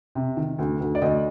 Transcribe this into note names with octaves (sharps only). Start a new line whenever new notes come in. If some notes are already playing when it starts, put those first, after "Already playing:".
C3
D#3
D2
D2
D5
D2 D#5